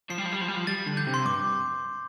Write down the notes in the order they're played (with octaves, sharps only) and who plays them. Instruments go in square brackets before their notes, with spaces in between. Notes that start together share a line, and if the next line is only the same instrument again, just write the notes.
[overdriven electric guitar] F3 [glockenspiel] C7
[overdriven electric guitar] G3
F3
G3
F3
G3
F3
[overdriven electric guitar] G3 [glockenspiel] A6
[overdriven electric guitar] D3
[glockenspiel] G6
[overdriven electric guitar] C3
[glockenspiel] C6
[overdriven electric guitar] G2 [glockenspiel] D6